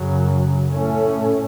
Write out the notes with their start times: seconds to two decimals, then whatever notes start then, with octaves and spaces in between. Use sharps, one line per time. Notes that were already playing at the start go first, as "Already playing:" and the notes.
Already playing: F#2 C#3 F#3
0.69 A2 A3 C#4